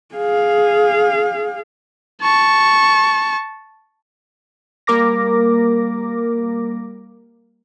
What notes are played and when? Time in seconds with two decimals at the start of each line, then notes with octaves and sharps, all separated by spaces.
0.15 G#4 F5
2.22 A5 C#6
4.87 G3 A#3 A#4 D6 A#6